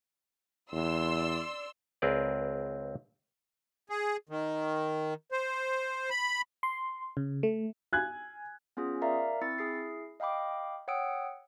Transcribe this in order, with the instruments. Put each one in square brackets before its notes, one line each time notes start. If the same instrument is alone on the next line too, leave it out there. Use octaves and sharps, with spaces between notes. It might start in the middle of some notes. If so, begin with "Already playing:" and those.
[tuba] E2 [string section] D5 C6 E6
[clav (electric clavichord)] C#2 C4 G#4 A#4 B4 D5
[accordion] G#4
D#3
C5
B5
[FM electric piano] C6
C#3
A3
[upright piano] G#5 F#6 G#6
[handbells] B3 C#4 F4 G#4
A#4 D5 E5 F5 A#5
C4 E4 E6 A6 C#7
E4 G#4 C7
D#5 F5 G5 B5 D6
C#5 F#5 G5 D#6 E6 D7